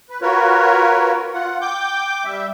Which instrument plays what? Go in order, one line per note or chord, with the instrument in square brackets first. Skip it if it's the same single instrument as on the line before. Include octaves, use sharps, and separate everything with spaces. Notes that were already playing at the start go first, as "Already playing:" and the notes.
[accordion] B4
F4 F#4 A#4 B4 C#5
F4 F#5
G5 D6 G6
G3 E5